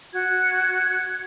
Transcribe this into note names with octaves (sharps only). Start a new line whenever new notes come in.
F#4 G#6